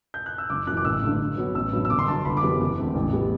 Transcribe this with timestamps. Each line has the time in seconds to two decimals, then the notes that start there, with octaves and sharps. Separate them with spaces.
0.14 G6
0.26 F#6
0.38 E6
0.50 F#1 D6
0.67 F#2 E3 F#6
0.77 D6
0.85 A1 E6
1.03 G2 D3 A3
1.20 G2
1.38 F#3 B3
1.55 A1 E6
1.73 G2 F#3 B3
1.85 E6
1.90 G1 D6
1.99 C6
2.07 G2 F#3 A5
2.25 G1 B5
2.37 D6
2.43 F#2 E3 G3 B3
2.61 F#1 D6
2.78 E2 D3 A3 C4
2.95 A1
3.13 A2 G3 B3